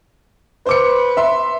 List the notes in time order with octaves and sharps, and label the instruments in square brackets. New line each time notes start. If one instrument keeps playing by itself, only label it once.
[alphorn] B4 [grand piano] C5 D6 C#7
[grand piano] E5 C6